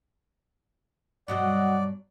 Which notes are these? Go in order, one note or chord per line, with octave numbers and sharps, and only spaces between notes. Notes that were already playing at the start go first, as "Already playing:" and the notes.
G2 B2 F#3 F#4 D5 D#5 F#5